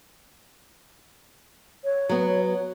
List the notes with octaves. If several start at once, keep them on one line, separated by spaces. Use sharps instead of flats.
C#5
F#3 B3